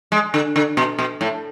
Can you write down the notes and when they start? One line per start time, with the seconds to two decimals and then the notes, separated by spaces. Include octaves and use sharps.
0.12 G#3
0.34 D3
0.56 D3
0.77 B2
0.99 B2
1.21 A2